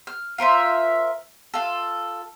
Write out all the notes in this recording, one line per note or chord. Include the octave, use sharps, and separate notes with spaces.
F6
F4 A#4 C5 E5
F4 A4